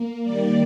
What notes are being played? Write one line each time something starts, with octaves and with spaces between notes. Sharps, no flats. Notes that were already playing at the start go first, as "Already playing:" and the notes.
Already playing: A#3
D#3 G3 A#3 D5